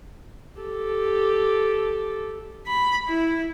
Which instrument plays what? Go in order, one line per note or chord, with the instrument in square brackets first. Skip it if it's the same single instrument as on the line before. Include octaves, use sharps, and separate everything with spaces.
[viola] G4 A4
B5
E4